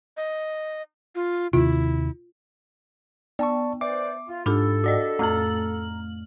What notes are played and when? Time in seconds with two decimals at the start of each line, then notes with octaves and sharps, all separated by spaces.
0.17 D#5
1.15 F4
1.53 D#2 C3 E4 F4
3.39 B3 D5 A5 C#6
3.81 B4 C5 D5 E5 D6
4.27 F4
4.46 G#2 D4 F4 G4 A4 B5 E6
4.84 F#4 D5 D#5
5.19 F2 A2 A3 A#5 F6 F#7